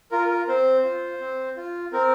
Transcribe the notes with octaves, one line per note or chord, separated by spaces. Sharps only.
F4 A#4
A#4
C4 C5
F4
C4
F4
C4 A#4